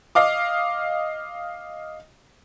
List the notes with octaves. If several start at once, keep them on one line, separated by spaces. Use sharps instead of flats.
D#5 F5 D6